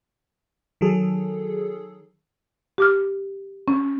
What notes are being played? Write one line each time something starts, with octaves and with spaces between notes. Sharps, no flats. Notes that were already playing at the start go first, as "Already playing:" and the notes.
D#3 F#3 G#4 A4
G4 D6 F6
C#4